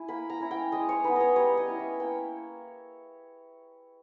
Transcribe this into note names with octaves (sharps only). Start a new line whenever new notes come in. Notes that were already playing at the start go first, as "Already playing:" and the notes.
Already playing: E4 G#5
A#3 B5
A#5
C#4 E4
G5
G#3 D#5
C#5
B3 D#4 B4
C#5 D#5
G3 C#5
D#5
C#4 E4
E5
A#3 G5